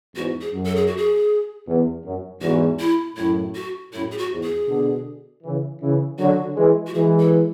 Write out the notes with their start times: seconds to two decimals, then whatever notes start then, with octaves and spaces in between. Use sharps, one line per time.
0.15 E2 G#2 F#4
0.41 G#4
0.53 F#2
0.66 A4
0.76 G#4
0.87 F#4
0.97 G#4
1.66 E2
2.05 F#2
2.41 E2 G#2 F#4
2.79 E4
3.17 F#2 A2 E4
3.55 F#4
3.92 F#2 A2 E4
4.12 G#4
4.18 F#4
4.30 E2 G#2
4.43 G#4
4.67 B2 D3
5.43 C#3 E3
5.81 C#3 E3
6.19 D3 F#3 F#4
6.56 E3 G#3
6.87 F#4
6.94 E3 G#3 G#4
7.19 A4